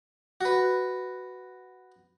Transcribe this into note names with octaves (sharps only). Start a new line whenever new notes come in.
F#4 B4